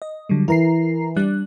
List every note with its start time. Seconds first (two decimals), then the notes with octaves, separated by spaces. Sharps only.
0.02 D#5
0.29 D3 F#3 G3
0.48 E3 A#4 A#5 C7
1.17 G3 D4 F#6